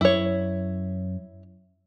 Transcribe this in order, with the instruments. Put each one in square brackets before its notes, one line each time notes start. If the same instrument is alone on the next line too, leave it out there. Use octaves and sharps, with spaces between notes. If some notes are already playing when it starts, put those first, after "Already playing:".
[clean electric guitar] F#2 [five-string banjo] E4 C#5